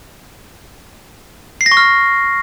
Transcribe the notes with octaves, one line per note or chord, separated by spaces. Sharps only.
C7
A#6
C#6
F6